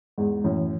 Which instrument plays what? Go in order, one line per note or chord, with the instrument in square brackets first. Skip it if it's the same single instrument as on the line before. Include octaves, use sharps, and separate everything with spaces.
[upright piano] E2 G#2 [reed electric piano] G#3
[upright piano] F#2 A2 [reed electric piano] E3